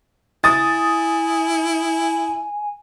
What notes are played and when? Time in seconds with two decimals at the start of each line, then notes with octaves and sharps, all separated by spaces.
0.44 E4 G#5 D#6 A6